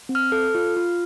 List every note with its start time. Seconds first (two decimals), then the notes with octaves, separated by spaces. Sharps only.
0.09 C4
0.15 F6
0.32 A4
0.55 F4
0.76 F4